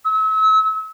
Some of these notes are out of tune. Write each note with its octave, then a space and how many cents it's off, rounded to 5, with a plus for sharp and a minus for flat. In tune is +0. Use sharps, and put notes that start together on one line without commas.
E6 -35